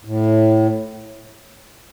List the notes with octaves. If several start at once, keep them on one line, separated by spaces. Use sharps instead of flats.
A2